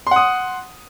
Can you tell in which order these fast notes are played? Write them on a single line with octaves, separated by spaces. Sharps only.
C6 F#5 D#6